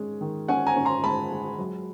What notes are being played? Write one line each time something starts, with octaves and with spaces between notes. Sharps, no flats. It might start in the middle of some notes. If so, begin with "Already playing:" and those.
Already playing: D#3 G#3 C#4
D#3
C#4 F#5 G#5
G#5 A#5
C#4
A#5 C6
G#3 A5 B5
G#3
F#3